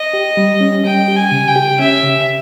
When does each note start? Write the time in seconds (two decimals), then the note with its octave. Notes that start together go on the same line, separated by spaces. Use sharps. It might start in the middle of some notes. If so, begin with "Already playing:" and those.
Already playing: D#5
0.13 G4
0.37 G3
0.61 C#4
0.85 G3 G5
1.08 G4
1.16 G#5
1.32 C#3
1.47 G5
1.56 G4
1.79 C#4 E5
2.03 C#3